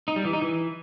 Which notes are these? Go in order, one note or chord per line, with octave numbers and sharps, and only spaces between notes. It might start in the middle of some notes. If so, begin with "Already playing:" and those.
D#4
G3
E3
D#4
E3